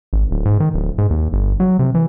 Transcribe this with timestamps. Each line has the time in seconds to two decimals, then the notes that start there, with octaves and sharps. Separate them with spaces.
0.13 G#1
0.31 D1
0.45 G#2
0.60 D#3
0.74 D1
0.98 G#2
1.11 D#2
1.33 G1
1.60 F#3
1.79 C3
1.95 E3